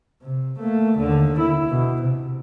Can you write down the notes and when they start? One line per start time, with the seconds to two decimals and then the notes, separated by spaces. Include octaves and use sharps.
0.22 C3
0.58 A3 A#3
0.98 D#2 D3
1.39 E4
1.70 B2
2.02 C3